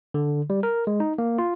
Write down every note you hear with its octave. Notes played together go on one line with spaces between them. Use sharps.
D3
G3
A#4
G#3
D#4
A#3
F4